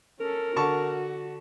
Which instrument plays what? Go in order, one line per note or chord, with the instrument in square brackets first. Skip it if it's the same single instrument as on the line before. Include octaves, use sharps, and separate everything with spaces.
[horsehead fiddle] C#4 A4 [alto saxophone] A#4
[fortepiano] D3 A5 C#6 [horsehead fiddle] F#4